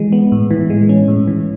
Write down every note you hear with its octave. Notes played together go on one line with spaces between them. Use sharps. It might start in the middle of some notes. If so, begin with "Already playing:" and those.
Already playing: E3 G#3
B3
A2
E3
G#3
C#4
A2
E3